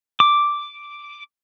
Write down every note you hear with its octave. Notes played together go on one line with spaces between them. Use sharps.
D6